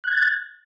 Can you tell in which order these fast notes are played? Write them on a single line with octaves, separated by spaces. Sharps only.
F#6 G#6 A6